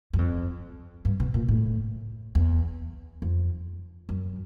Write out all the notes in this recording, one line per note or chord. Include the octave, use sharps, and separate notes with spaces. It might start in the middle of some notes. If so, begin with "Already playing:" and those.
F#2
F2
G2
B2
A#2
A2
E2
F2
F#2